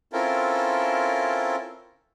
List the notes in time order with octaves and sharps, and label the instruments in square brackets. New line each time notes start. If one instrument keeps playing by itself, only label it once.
[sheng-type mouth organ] C4 C#4 E4 F4 A4 A#4